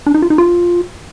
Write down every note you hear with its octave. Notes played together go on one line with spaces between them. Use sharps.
D4
D#4
F4
D#4
F4